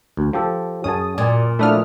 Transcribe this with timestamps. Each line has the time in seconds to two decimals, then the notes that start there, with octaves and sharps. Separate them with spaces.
0.17 D2
0.33 F3 G4 A4
0.84 F#2 C#4 G#4 A5 D#6
1.18 A#2 D5 G#5
1.59 F3 A3 D4 E4 D#6 F6